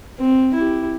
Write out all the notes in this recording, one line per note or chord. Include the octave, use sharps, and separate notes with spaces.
C4
E4 G4